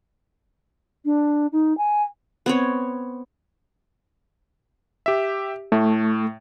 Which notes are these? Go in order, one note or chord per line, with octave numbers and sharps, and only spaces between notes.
D4
D#4
G#5
B3 C4 C#5
G4 E5
A2 A3